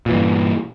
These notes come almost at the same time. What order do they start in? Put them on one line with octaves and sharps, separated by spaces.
A#2 E3 G2